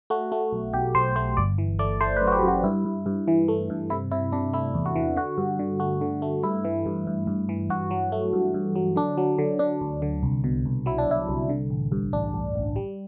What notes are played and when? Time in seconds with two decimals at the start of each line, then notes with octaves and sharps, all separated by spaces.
0.10 A3 F#4
0.32 A3
0.53 B1
0.73 B1 G4
0.95 B1 C5
1.16 A3 C5
1.37 G1 D5
1.58 E3
1.79 A3 D5
2.01 A3 C5
2.16 B4
2.21 F#2
2.27 F#4
2.32 G4
2.43 F#2
2.48 F#4
2.64 G2 E4
2.85 G2
3.06 G2
3.28 E3
3.48 A3
3.70 G2
3.90 C3 E4
4.11 C3 E4
4.32 C3 D4
4.53 A3 E4
4.74 E2
4.86 F#4
4.96 E3
5.16 D3 F#4
5.38 G2
5.59 D3
5.80 A3 F#4
6.01 D3
6.22 A3
6.43 G2 E4
6.65 E3
6.86 G2
7.07 G2
7.27 G2
7.49 E3
7.70 G2 F#4
7.91 F#3
8.12 A3
8.33 G2
8.54 G2
8.76 F#3
8.96 D3 D4
9.17 F#3
9.38 D3
9.59 D3 D4
9.81 D2
10.02 D3
10.23 C2
10.44 B2
10.65 C2
10.86 F#3 E4
10.98 D4
11.08 C2 E4
11.29 C2
11.49 D3
11.70 A1
11.92 G2
12.13 A1 D4
12.34 A1
12.55 A1
12.76 G3